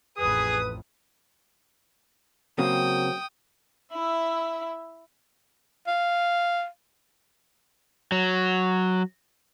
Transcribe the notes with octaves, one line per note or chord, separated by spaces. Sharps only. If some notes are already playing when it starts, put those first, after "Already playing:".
A1 F2 G#4 B4 D#6
C#3 F#3 A#3 C4 G5 D#6
E4 E5
F5
F#3